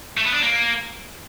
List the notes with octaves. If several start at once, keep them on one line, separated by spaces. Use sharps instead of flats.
A3
B3
D4
A#3